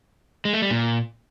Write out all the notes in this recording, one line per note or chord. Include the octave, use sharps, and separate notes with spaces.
G#3
A3
G3
A#2